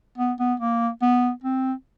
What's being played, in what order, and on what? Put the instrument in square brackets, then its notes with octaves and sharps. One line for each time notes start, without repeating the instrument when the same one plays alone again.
[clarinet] B3
B3
A#3
B3
C4